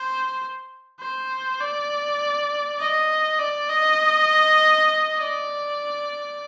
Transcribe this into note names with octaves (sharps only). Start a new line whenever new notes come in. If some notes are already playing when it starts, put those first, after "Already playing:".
Already playing: C5
C5
D5
D#5
D5
D#5
D5